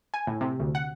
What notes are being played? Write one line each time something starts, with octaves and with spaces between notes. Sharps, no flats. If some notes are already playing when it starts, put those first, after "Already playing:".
G#5
A2
C3
D2
F#5